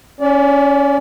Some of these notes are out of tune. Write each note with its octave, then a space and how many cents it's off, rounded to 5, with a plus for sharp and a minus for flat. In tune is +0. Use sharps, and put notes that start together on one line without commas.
C#4 +10 D5 -25